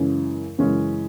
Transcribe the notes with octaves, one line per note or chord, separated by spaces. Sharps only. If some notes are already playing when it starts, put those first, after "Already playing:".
Already playing: F#2 C#3 E3 G#3 C#4
F#2 C#3 E3 G#3 C#4